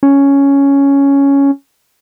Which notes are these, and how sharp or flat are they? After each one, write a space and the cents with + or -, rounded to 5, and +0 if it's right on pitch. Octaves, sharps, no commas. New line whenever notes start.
C#4 +5